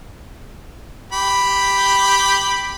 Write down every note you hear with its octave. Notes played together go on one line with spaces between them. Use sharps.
G4 B5